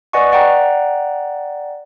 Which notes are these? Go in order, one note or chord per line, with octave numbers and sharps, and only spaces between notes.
B4 D5 D#5 F#5 G#5 C#6
D5 F#5 G5 A#5